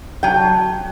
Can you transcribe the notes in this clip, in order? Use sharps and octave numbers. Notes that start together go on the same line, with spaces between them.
F#3 G5